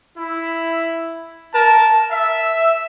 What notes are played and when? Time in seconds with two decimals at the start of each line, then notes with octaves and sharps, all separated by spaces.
0.18 E4
1.55 A#4 A5
2.11 E5